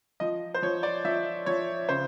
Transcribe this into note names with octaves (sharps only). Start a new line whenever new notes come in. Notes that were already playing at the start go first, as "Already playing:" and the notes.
F3 D#5
C5
F3 C#5
D5
F3 E5
F3 C#5
C#3 C5